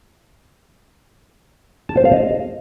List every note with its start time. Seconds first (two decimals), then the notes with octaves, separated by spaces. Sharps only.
1.89 A5
1.97 C5
2.05 F5
2.13 D#5